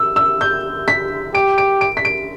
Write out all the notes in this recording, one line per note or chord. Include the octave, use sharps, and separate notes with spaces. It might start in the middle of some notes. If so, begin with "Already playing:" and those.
Already playing: E6
E6
G6
B6
G4 D7
D7
D7
B6
D7